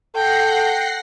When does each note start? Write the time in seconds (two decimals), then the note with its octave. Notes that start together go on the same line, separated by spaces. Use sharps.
0.15 A4 F#5 G5 A#6 C7